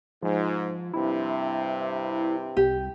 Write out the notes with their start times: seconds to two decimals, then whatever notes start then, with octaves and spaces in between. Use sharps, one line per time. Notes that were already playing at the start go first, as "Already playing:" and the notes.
0.23 G#2 F3
0.94 G2 C3 E4
2.57 C2 G4